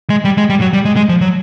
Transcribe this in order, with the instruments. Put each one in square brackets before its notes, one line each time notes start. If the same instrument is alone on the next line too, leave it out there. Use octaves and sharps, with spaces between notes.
[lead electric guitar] G#3
G3
G#3
G3
F#3
G3
G#3
G#3
F3
F#3